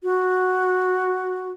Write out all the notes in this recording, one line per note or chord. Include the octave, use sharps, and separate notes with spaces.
F#4